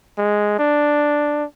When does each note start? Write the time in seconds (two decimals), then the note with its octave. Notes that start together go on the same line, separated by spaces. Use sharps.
0.18 G#3
0.59 D4